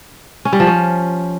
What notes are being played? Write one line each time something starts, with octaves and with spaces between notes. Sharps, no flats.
C#4
G3
F3
C#4